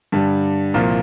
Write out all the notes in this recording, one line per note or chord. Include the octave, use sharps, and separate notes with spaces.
G2 D3 G3 D4
C2 A#2 F3 A#3 F4